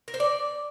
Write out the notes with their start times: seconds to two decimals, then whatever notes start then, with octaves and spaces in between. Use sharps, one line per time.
0.08 A#4
0.14 C5
0.20 D5